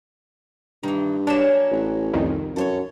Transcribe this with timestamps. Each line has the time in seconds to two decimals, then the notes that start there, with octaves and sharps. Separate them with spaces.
0.83 G2 D#3 E3
1.27 F#3 A#3 C#4 D4 E7
1.71 A1
2.13 C2 F2 D#3
2.56 F#2 A4 C5 C#5